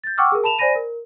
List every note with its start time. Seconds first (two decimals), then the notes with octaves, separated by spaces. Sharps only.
0.04 G6 A6
0.18 F#5 G5 C#6 D6 E6 F6
0.32 G#4 A#4
0.44 A5 B5 E7 F7
0.59 C5 D5 G#5 B5 A#6 D#7
0.76 A#4